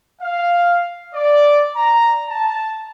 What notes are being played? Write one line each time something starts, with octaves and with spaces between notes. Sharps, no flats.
F5
D5
A#5
A5